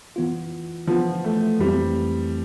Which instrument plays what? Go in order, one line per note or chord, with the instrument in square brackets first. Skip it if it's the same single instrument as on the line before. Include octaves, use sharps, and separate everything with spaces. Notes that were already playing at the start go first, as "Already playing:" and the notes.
[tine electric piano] E3 B3 F4
[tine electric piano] E3 B3 F4 [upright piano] F3
[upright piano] A3
[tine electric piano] F2 E3 A3 C4 [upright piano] G3